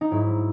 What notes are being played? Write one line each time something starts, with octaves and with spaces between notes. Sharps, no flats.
D#4
G#2 F#3 E4